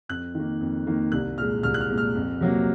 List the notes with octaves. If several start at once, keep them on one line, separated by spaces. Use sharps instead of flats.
F2 F#6
D#3 A#3
F2
D#3 A#3
C2 F#6
A#2 G#3 F6
C2 F6
F#6
F6
A#2 G#3
F6
F2
C3 F#3 A#3